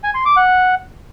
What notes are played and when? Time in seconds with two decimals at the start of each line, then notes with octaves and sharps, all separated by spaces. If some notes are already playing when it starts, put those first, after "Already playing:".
0.04 G#5
0.15 C6
0.26 D6
0.37 F#5